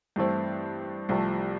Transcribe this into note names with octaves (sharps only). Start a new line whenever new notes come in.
G2 E3 A3 C4 E4
C2 C3 F3 A3